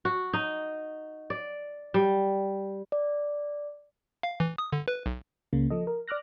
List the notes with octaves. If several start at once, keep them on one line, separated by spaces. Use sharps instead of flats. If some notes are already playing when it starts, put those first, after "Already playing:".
F#4
D#4
D5
G3
D5
F5
E3
D#6
D3
B4
B1
C#2 C#3 A#3
F3 A4 D#5
A#4
D5 D6 F6 F#6 A#6